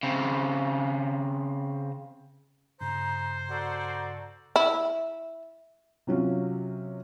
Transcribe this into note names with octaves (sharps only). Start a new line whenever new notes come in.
C#3 C4
G2 C#3 C5 A#5
F#4 A4 D5 A#5
E4
C3 F#3 C#4 F4